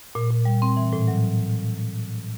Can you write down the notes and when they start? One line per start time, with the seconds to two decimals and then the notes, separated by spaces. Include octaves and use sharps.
0.15 A#2
0.31 A#2
0.45 G3
0.62 C4
0.77 E3
0.93 A2
1.08 F#3